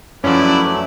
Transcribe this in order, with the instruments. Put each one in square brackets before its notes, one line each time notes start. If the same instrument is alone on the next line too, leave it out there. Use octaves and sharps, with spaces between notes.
[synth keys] F#2 F3 [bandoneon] F#3 A3 [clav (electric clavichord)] C#4 [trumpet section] E4 B4 D5